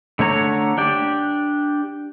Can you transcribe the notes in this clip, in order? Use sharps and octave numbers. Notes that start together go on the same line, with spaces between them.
D3 A3 C#5 A#5
D4 G4 D5